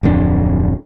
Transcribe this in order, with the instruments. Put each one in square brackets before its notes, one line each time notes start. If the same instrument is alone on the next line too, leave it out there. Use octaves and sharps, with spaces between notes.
[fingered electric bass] D1 F2 G3 D4